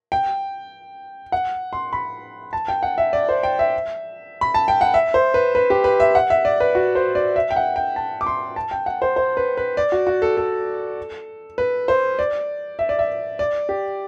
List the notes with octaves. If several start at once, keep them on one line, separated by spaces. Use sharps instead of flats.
G5
F#5
C6
B5
A5
G5
F#5
E5
D5
C5
G5
E5
B5
A5
G5
F#5
E5
C5
B4
B4
G4
B4
E5
F#5
E5
D5
B4
F#4
C5
D5
E5
G5
F#5
G5
A5
D6
C6
A5
G5
F#5
C5
C5
B4
B4
D5
F#4
F#4
A4
A4
B4
C5
D5
E5
D5
E5
D5
G4